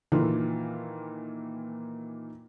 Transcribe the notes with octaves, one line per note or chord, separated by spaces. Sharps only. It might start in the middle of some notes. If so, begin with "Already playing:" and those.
A#2 D#3 E3 F4 A4